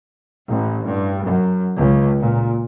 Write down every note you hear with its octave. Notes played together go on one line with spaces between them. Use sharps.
A1
G2
F#2
C#2
A#2